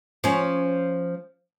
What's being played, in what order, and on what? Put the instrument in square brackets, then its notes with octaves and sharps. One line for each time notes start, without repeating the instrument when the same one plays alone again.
[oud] F3 C#4